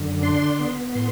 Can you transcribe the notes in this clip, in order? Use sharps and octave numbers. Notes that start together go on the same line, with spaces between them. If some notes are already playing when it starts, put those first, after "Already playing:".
Already playing: F#2 D3
D4 C6
B3
A2 C6